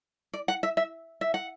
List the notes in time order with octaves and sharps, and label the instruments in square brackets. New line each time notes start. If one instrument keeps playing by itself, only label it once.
[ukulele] D5
F#5
E5
E5
E5
F#5